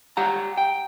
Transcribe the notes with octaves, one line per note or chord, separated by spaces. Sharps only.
G4 F#5 A#5
G5